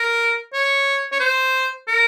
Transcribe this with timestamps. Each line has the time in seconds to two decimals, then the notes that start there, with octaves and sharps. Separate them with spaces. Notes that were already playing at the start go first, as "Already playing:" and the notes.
Already playing: A#4
0.53 C#5
1.12 C#5
1.20 C5
1.88 A#4